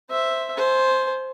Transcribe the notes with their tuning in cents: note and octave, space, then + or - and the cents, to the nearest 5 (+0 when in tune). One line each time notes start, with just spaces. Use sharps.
C5 +0 E5 +0
C5 +0 G#5 +40